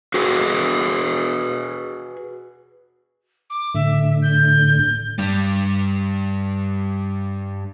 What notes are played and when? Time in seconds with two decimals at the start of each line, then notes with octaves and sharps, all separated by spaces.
0.14 F#4 G#4 B4
3.50 D6
3.74 A2 D3 E5
4.22 G6
5.18 G2 G3